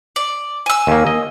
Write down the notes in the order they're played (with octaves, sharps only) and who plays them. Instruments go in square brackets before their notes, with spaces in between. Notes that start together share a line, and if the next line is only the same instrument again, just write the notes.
[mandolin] D5
G#5 E6
[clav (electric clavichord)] D#2 A#3
D#5